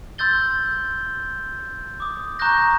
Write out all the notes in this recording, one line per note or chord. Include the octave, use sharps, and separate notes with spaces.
C6 E6 G6 A6 G7
D6 D#6
A#5 C#6 D#6 F#6 G6 A#6